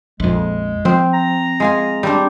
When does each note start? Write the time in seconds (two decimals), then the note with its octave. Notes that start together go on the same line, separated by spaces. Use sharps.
0.20 A#1 F2 G#3
0.85 F3 C4
1.14 A#5
1.60 G#3 F4 G#5
2.03 G3 C4 D4